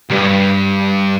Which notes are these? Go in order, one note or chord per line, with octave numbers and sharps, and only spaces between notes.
C2 G2